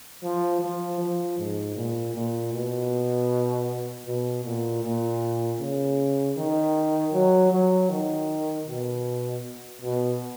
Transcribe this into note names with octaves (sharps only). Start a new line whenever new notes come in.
F3
F3
F3
G#2
A#2
A#2
B2
B2
A#2
A#2
C#3
D#3
F#3
F#3
D#3
B2
B2